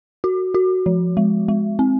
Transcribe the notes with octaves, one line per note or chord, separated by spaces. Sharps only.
F#4
F#4
F3
G#3
G#3
C4